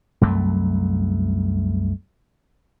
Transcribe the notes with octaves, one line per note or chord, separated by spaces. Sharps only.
C2 F#2 F#3 A3